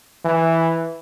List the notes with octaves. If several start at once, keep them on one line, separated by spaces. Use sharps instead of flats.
E3